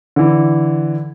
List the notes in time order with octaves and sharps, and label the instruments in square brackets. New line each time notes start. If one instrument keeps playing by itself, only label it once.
[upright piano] D3 E3